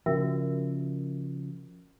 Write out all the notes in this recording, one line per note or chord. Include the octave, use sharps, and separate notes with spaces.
C#3 F3 F#4 A#4 E5